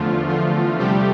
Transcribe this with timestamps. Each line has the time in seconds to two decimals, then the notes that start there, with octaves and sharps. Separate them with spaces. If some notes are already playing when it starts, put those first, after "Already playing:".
Already playing: E2 D3 F3 A3 F4
0.29 F3 F4
0.79 C3 F3 G3 A3 G4